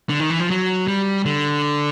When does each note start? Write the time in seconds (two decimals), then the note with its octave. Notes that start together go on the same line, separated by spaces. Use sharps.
0.10 D3
0.20 D#3
0.30 E3
0.40 F3
0.50 F#3
0.88 G3
1.25 D3